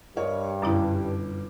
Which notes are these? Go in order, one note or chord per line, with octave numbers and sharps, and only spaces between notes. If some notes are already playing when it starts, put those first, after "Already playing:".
G2 A#4 C#5 D#5
G1 F#2 B2 C#4 E4 D6